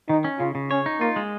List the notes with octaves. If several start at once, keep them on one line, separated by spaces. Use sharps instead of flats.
D#3 D#4
C#4
C#3 F4
C#3
C#4 C#5
D#4
A#3 F4
G#3